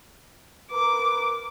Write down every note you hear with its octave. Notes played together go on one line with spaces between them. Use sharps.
A#4 B4 D6